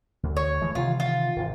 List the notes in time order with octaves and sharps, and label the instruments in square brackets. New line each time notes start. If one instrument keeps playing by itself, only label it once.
[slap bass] D2
[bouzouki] C#5
[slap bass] E3 G#3 A3
[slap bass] C3 D#3 E3 [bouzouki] F4
[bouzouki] F4
[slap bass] G#1 C3